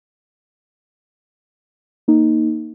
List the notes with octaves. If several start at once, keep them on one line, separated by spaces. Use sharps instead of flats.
A#3 D#4